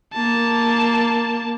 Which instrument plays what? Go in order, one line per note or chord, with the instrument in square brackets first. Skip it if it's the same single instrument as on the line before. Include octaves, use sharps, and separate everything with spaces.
[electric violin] A#3 A5